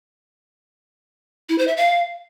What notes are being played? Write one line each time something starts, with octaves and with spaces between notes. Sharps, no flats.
E4
C5
E5
F5